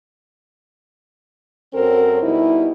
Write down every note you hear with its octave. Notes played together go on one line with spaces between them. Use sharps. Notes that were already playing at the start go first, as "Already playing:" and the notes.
F#2 F#3 C4 A4 A#4
B2 G3 D#4 E4